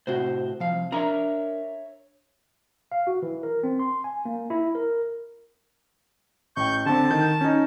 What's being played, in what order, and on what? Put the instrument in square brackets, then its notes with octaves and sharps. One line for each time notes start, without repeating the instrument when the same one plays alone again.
[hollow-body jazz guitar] A2 C3 F#4 [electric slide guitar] C5
[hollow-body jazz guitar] C2 F5 [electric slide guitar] F3
[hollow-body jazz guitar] D4 A#4 [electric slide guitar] C#5 E5 A#5
[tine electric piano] F5
F#4
E3
A#4
C4
C6
G#5
A#3
E4
A#4
[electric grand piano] A1 G5 [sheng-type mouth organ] C#6 G6
[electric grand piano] D3 C4 [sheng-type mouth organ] A5
[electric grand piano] D#3 G6
C#4 D#4